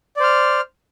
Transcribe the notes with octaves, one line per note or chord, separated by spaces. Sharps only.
C5 D5 F6